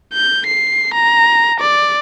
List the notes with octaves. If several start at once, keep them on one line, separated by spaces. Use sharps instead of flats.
G6
C7
A#5
D5